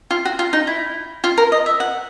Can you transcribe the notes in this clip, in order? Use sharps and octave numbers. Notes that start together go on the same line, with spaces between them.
F4
F#4
F4
D#4
E4
F4
A#4
D#5
E5
F#5